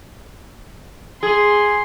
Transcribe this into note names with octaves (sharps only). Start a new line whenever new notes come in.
G#4 C6